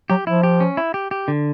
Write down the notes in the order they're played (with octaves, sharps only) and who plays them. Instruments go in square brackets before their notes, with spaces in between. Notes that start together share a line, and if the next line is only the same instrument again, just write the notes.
[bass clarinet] F#3 [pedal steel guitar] G4
[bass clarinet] F3 [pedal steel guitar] E4
[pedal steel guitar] G4
C#4
E4
G4
G4
D3